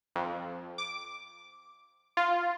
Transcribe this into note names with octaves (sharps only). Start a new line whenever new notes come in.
F2
D6
F4